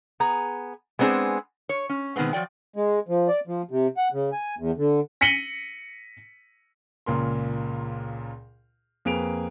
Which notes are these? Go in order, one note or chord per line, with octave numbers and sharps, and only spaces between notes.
B3 G#4 A#5
G#3 B3 C4 D4 G#4
C#5
C#4
B2 D#3 G#3 B3 C4
F3 F#3 D5 G5
G#3
F3
D5
F3
C3
F#5
C#3
G#5
E2
D3
A#6 B6 C#7 D#7 F#7 G7
C#2 A#2 A#4 C6
F2 A#3 G#4 B4 D7 F7